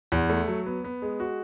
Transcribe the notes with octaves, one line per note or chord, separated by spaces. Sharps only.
E2
A3
F#3
B3
B3
G#3
F#4